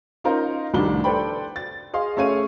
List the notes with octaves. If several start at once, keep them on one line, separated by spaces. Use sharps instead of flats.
C#4 D#4 F4 A#4 C5
F1 C2 A2 D#3 D4 G7
A4 B4 C5 D5 G5 B5
A6
G#4 D#5 F5 C6
A3 C#4 G#4 C#5 F5 D#7